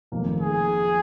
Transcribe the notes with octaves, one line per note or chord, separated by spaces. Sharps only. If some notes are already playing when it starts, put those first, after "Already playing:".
F1 F2 D#3 A#3
G#4